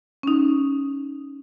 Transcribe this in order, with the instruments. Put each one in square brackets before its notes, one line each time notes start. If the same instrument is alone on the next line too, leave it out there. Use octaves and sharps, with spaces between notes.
[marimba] C#4 D#4